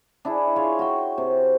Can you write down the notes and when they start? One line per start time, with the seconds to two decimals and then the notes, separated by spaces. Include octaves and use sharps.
0.25 D4 E4 G#4
0.56 F4 G#4 C#5
0.79 F#4 G5
1.18 C3